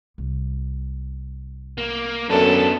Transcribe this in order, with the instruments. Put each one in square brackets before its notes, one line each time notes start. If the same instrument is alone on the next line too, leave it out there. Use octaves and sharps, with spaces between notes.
[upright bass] C2
[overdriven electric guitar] A#3
[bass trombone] F#2 [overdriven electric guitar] B3 D4 [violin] A4